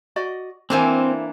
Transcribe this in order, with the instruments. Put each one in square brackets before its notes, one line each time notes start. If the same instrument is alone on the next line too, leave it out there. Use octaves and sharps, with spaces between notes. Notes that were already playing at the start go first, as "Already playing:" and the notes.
[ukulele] F#4 D5 D#5
[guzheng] E3 A#3 D4 [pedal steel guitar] C4 [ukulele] E4 C5 G#5